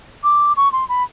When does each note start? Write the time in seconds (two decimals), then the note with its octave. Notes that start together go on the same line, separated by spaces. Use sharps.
0.23 D6
0.57 C#6
0.72 C6
0.89 B5